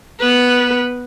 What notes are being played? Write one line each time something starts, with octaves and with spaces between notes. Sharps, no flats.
B3 B4